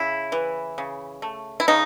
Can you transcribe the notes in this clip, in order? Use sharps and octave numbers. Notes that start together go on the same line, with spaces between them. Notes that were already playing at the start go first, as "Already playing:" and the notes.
Already playing: C#3 E4
E3
C#3
A3
E4
C#3 D#4